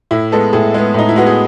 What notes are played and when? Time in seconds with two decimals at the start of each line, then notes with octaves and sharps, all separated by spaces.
0.11 A2 E4
0.32 G#3 B3 A4
0.53 A2 G#4
0.74 G#3 B3
0.94 A2 D#4
1.09 E4
1.16 G#3 B3 F#4
1.27 G#4